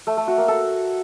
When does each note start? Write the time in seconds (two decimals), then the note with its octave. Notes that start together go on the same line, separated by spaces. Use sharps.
0.07 A3
0.17 A3
0.27 F#4
0.38 A#3
0.48 A4